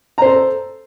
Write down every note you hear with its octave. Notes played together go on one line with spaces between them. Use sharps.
A4 C5 A#5